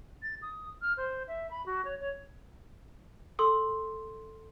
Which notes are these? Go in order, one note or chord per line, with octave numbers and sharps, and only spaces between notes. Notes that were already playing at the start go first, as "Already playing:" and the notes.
A6
D#6
F6
C5
E5
B5
F#4
C#5
C#5
A4 C6 D#6